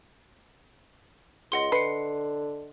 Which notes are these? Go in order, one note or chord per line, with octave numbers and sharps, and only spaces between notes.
C#2 D#5 F#5 C6
D3 B4 C7 C#7